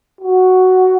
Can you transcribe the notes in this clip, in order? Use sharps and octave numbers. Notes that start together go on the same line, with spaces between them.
F#4